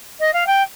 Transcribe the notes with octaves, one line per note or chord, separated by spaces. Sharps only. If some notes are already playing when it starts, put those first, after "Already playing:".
D#5
F5
G5